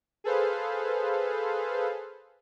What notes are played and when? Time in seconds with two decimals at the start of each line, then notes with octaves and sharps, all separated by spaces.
0.24 G#4 A4 B4 C5 F5